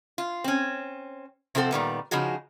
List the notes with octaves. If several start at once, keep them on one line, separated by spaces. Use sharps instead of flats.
F4
C4 C#4
C3 F3 C4 A4 F#5
A#2 D#3 G3 B3
C#3 F3 D#4 F#4 G#4